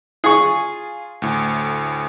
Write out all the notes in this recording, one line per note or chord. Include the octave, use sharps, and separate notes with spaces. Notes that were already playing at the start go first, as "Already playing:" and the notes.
F4 G#4 C#6
D2 A2